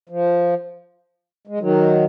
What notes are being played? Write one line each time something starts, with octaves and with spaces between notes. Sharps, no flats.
F3
G#3
D#3 F#3